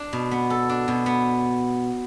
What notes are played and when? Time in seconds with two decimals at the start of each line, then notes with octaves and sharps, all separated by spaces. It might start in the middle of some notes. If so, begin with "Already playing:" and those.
Already playing: D4
0.13 B2
0.31 B3
0.50 A4
0.69 D4
0.88 B2
1.06 B3